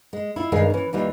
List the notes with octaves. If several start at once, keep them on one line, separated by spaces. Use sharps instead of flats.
G#3
E4 F4
G2 D#3 G#3 G#4 F5
E3 C#4
D#2 E3 G3 F4